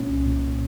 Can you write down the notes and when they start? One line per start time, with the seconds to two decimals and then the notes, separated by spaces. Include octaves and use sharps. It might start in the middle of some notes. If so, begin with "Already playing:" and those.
Already playing: A#2 C#4
0.09 C2
0.26 A#2